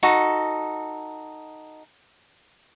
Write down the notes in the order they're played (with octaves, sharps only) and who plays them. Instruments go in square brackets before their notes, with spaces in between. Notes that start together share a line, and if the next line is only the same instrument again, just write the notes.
[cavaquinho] D#4 F#4 A4